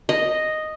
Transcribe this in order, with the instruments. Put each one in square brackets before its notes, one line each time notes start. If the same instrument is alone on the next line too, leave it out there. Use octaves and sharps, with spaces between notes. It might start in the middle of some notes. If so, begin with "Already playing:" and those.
[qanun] D#5